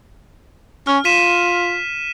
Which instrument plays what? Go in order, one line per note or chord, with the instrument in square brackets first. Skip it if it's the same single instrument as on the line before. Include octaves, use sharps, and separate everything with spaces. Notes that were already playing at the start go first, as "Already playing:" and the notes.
[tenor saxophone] C#4 [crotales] F6
[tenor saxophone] F4 [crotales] B6 D#7 E7